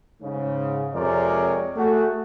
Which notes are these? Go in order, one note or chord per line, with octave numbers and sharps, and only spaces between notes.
G#2 C#3
F2 C3 G#3 A#4 C#5 D5
A3 F#4 G#4